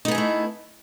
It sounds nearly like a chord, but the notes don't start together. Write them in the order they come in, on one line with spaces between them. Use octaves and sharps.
D#4 B3 G#4 E4 A3